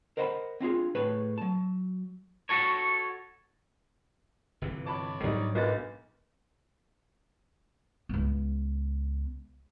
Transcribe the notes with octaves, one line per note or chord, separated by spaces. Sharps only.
A#4 C5 D#5 F#5 G#5 B5
C4 D4 F4 G#4
A2 G#4 B4 C#5 A5
F#3 A5
F#4 A4 C#5
G1 C3 E3
C#5 A5 B5 D6
G#2 F#3 G3 D4 D#4
B1 A#3 B4 A6
C#2 B3